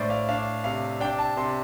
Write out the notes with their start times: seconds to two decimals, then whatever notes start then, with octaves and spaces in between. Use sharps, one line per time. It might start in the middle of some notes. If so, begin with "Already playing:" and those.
Already playing: A2 D4 C5 D5
0.10 F5
0.28 D4 F5
0.64 C3 F5
1.00 D4 G5
1.19 A5
1.37 C3 C6